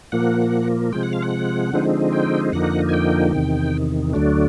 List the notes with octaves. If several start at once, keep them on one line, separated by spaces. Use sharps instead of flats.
A#2 F3 A#3 F#5
C3 F3 G#3 G5
F#5
F5
F#5
D3 F3 G#3 C4 D#4
G5
F2 D3 F3 A#3 D#4 F#5
G#5
G5
E2 C3 D#3
D2 D3 F#3 A3 D4